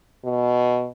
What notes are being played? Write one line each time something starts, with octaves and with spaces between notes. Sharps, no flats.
B2